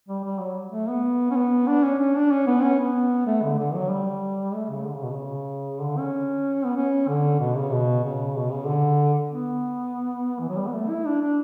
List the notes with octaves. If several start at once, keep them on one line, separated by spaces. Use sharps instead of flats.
G3
G3
F#3
A3
B3
C#4
B3
D4
C#4
C#4
D4
C#4
B3
C#4
B3
A3
D3
D3
F#3
G3
A3
C#3
D3
C#3
B2
C#3
D3
C#4
B3
C#4
D3
B2
C#3
B2
C#3
B2
C#3
D3
B3
E3
F#3
G3
B3
A3
E4
D4
D4